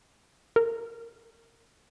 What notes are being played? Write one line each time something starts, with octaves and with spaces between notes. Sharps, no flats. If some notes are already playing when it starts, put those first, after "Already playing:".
A#4